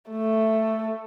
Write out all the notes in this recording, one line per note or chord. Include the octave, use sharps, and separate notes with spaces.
A3